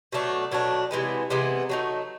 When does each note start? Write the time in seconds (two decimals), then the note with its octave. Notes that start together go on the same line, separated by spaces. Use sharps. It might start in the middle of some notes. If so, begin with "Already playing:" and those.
0.12 B2 F#3 A3 D4
0.51 B2 F#3 A3 D4
0.91 C3 E3 G#3 B3
1.30 C3 E3 G#3 B3
1.69 F#3 A3 C4 D#4